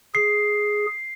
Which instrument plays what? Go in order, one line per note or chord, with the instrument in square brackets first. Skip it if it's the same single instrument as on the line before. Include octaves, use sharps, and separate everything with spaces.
[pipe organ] G#4 [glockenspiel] C7